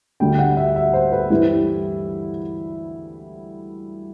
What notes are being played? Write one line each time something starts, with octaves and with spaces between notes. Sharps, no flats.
D2 D3 G3 G5
F#5
E5
E5
C5
B4
G2 E3 G3 E4